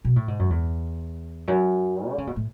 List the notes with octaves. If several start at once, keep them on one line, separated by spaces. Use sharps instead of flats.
B2
A2
G#2
F#2
E2
F#2
D3
C#3
B2
A2